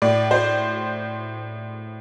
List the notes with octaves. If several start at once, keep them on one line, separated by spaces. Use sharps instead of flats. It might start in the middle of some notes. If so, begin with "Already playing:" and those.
A2 D5
C5